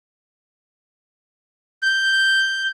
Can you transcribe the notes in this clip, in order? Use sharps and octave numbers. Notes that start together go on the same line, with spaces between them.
G6